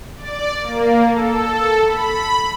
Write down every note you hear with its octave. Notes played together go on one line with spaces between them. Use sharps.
D5
A#3
A4
B5